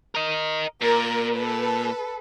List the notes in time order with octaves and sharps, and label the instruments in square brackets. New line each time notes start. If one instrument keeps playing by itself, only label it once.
[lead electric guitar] A#4 D#5
[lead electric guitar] A#2 [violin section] A#4
[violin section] A4 B4